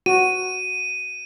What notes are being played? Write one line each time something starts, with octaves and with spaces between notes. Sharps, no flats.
F#4 D#7